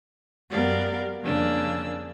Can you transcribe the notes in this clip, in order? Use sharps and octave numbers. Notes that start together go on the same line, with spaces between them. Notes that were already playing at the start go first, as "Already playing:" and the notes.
F#2 B3 G4 A#4 D5 F5
F2 C#3 A#3 D4 E6